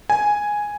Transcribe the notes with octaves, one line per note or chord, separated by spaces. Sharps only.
G#5